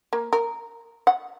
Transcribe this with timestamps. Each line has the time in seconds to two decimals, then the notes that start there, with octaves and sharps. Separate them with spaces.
0.13 A#3
0.33 A#4
1.07 F#5